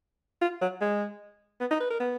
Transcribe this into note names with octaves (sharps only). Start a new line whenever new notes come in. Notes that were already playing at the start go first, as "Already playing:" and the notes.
F4
F#3
G#3
B3
D#4
B4
A#4
B3